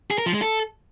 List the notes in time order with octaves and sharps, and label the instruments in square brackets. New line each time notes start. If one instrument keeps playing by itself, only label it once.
[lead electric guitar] G#4
A#4
F3
G#3
A4